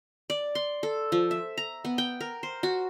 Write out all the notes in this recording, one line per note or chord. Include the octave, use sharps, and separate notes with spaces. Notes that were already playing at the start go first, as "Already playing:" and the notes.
D5
C6
A4
F3
E5
A#5
B3
G5
A#4
C5
F#4